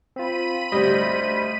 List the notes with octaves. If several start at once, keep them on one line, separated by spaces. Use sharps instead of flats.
C4 F4 B5 D#7
D2 G3 C5 D#5